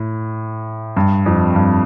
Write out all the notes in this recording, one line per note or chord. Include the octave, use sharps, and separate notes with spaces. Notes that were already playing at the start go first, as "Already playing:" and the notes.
Already playing: A2
G2
F2
G2